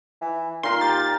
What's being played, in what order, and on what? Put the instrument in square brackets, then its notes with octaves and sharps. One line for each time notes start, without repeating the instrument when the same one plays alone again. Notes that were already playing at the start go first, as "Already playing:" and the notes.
[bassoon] E3
[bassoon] A#2 [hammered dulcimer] D#3 A#4 [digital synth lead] C6
[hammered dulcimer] G4 [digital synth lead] A6